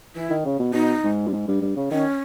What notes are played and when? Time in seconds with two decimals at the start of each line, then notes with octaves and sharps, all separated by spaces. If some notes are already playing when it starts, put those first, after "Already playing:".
0.16 E3 E4
0.30 D#3
0.45 C#3
0.60 B2
0.74 B2 D#4
1.04 G#2
1.27 G2
1.33 G#2
1.48 G2
1.62 G2
1.77 C#3
1.91 D#3 C#4